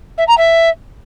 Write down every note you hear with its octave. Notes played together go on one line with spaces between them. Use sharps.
E5
A#5
E5